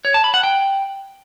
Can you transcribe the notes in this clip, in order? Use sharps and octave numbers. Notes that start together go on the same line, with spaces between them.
C#5
A5
B5
F#5
G5